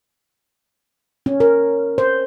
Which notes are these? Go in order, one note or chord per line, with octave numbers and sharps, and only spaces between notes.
C#4
A#4
C5